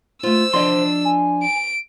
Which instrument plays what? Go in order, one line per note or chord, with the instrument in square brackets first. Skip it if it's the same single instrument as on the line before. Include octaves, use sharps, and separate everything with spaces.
[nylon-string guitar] A3 F4 [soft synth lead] C5 [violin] E6
[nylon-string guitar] F3 D5 D#5 [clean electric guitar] D4 C6
[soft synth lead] G#5
[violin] D7